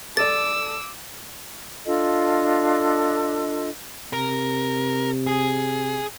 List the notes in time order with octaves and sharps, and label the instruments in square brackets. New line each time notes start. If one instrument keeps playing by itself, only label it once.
[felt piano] A4 D5 [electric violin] D6 E6 [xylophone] A6
[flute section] D4 F4 A4 D#5
[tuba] C3 [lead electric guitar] A#4
[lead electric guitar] G#4